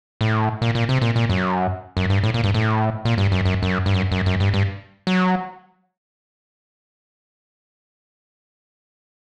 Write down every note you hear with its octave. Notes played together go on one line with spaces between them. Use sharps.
A2
A#2
A#2
C3
A#2
A#2
F#2
F#2
G2
A2
A#2
G2
A2
A#2
G2
F#2
F#2
F#2
G2
F#2
F#2
F#2
G2
G2
F#3